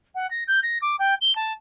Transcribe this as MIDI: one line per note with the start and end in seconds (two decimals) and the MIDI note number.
0.15 0.29 78
0.30 0.44 94
0.47 0.60 91
0.63 0.78 94
0.82 0.96 86
0.99 1.14 79
1.21 1.34 103
1.35 1.53 81